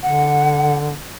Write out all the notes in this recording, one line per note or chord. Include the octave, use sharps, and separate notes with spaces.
D3 F#5